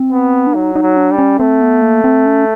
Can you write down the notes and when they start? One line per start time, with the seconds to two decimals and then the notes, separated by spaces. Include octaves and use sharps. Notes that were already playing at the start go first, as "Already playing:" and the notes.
Already playing: C4
0.12 B3
0.47 D4
0.54 F#3 D#4
0.76 D#4
0.82 F#3
0.97 D4
1.12 G3
1.19 C#4
1.39 A3 C4
1.61 B3
1.82 A#3
2.04 C4
2.26 C#4